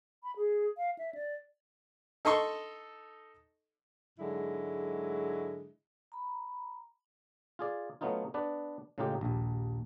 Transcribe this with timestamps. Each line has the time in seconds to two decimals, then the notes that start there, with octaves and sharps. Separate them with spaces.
0.23 B5
0.36 G#4
0.77 F5
0.99 E5
1.15 D5
2.25 D#4 A4 D#5 C6 C#6
4.19 G#2 D3 F#3 G#3 E4
6.12 A#5 B5
7.59 F4 G#4 D5
8.01 F#3 A3 B3 C#4 D#4 F4
8.34 B3 D4 B4 D5
8.98 A2 C#3 G#3 D#4 F4 G4
9.21 A#1 D#2